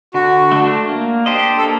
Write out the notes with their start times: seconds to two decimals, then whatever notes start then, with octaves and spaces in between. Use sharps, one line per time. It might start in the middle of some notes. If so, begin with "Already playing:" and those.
0.14 D3 F#4
0.52 A3 D4
0.89 A#3
1.26 D4 G4 C5 D#5
1.58 A4
1.63 A#3